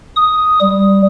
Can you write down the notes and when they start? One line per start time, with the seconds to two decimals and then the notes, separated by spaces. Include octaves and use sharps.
0.16 D#6
0.61 G3